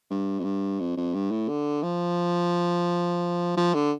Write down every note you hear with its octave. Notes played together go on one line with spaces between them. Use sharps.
G2
F2
G2
F2
F2
G2
A2
D3
F3
F3
D3